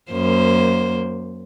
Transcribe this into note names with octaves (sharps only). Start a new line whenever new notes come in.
F#2 A#3 C5